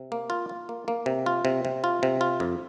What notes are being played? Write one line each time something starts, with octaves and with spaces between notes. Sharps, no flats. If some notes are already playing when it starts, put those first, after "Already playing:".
Already playing: C3
A#3
F4
F4
A#3
A#3
C3
F4
C3
C3
F4
C3
F4
F2